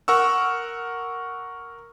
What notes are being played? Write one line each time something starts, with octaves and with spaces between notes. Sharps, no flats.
A#4 F#5 C#6 E6